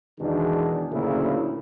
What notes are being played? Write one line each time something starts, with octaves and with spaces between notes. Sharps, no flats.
E2 B2 D#3 G#3 D4
D2 A#2 C#3 F#3 A#3 E4